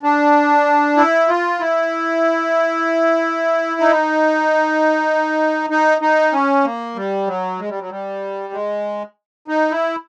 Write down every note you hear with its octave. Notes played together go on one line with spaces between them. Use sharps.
D4
E4
F4
E4
D#4
D#4
D#4
C#4
A#3
G3
F#3
G#3
G3
F#3
G3
G#3
D#4
E4